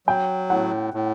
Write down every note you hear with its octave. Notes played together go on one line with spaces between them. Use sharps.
F#3 G5
A2 F#5
A2